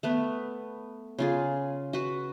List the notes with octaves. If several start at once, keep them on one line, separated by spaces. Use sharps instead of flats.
A3 B3 B4
C#3 F4 G#4
F#4 B4